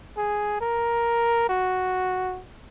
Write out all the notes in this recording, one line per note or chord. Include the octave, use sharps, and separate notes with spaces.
G#4
A#4
F#4